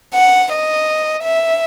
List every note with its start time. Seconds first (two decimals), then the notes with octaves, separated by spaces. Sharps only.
0.14 F#5
0.52 D#5
1.24 E5